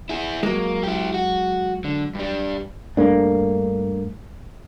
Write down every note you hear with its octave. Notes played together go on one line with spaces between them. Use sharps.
E4 G#4
F#3 G#3 A#3
E4 G4
F#4
D3
G2 G3
G2 A3 A#3 D4